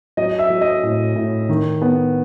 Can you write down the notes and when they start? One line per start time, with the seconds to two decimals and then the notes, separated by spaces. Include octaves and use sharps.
0.17 F#3 D#5
0.39 E5
0.50 F#3
0.61 D#5
0.83 A2
1.15 A2
1.49 D#3
1.82 B3